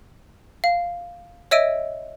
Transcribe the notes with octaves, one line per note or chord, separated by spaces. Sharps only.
F5
C#5 D#5 E5 E6 D7 D#7